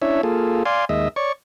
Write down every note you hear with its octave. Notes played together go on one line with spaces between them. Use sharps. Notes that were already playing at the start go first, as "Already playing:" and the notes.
C#4 D4 E4 C#5 E5
A#3 F4 G#4 A4
D5 F5 G#5 C6
D#2 G#3 D#5 E5
C#5 D5 C#6